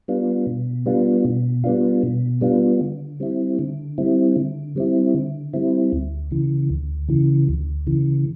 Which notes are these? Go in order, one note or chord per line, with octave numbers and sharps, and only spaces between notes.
G3 B3 D4 F4
B2
G3 B3 D4 F4
B2
G3 B3 D4 F4
B2
G3 B3 D4 F4
D3
G3 C4 E4
D3
G3 C4 E4
D3
G3 C4 E4
D3
G3 C4 E4
D2
C#3 E3
D2
C#3 E3
D2
C#3 E3